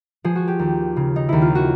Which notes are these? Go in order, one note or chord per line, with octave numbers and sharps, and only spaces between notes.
F3 G#4
F#4
G4
D#2
C#3
D#4
D#2 E4
F4
F#4